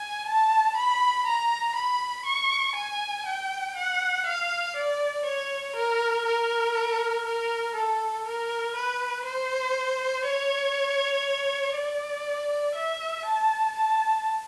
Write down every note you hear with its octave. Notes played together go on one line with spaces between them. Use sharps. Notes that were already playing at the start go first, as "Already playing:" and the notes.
Already playing: G#5
A5
B5
A#5
B5
C#6
G#5
G5
F#5
F5
D5
C#5
A#4
A#4
A#4
A4
A#4
B4
C5
C#5
D5
E5
A5
A5